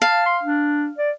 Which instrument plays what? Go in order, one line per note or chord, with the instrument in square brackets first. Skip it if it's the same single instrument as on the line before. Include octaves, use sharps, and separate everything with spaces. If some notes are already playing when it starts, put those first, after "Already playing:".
[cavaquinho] F5 [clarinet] A5
[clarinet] C6
D4
D5